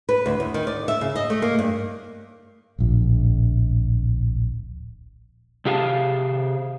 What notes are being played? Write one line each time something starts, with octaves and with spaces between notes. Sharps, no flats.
B4
D2
E2
D#3
D5
E5
C#3
D#5
A3
A#3
G2
D1 A#1
C3 G4 G#4 F5 A5